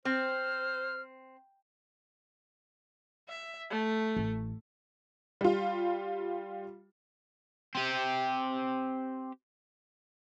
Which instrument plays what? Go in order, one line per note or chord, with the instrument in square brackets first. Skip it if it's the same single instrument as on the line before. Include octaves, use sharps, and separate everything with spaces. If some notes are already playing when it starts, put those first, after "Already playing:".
[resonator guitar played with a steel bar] C4 [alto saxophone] C5 [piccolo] F6
[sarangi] E5
A3
[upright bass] A1
[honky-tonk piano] G3 F4
[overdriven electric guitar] C4 G4